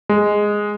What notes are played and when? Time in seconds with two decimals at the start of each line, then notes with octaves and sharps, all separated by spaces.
0.09 G#3